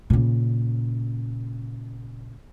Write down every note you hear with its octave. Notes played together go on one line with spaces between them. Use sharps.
A#2 C#3